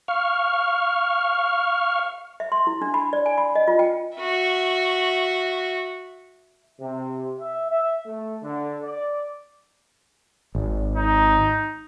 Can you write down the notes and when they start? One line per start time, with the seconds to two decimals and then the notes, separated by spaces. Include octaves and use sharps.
0.08 F5 C#6 F6
2.40 E5
2.52 C6
2.67 E4
2.82 D4
2.94 B5
3.13 D5
3.26 G#5
3.38 B5
3.55 D#5
3.68 F4
3.79 G5
4.17 F#4 E5
6.81 C3
7.40 E5
7.72 E5
8.06 A3
8.43 D3
8.84 D5
10.55 G#1
10.96 D#4